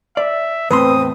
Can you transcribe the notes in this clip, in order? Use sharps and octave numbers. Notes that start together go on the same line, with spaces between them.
D5 E5
E2 A2 C4 B4 C6 D#6